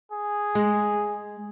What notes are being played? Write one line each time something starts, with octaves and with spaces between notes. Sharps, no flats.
G#4
G#3